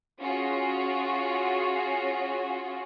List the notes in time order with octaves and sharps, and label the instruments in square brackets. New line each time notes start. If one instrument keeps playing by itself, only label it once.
[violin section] C#4 F4 F#4 G#4